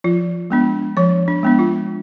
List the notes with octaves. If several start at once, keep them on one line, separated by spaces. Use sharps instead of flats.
F3 F4
G#3 B3 D4
F3 C#5
D4
G#3 B3 D4
F4